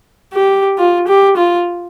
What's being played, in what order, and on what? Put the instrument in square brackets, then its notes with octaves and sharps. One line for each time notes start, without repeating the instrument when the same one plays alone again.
[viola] G4
F4
G4
F4